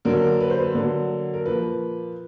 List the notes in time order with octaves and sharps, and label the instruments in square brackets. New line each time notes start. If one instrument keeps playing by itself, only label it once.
[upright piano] D3 F#3 A#3 A#4
B4
C5
B4
D3 F#3 A#3
A#4
A#2 F3 A#3 B4